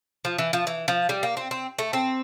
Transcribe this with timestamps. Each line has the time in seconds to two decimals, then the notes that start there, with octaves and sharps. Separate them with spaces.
0.25 F3
0.38 E3
0.53 F3
0.67 E3
0.88 F3
1.09 G3
1.23 A#3
1.37 C4
1.51 C4
1.79 A3
1.93 C4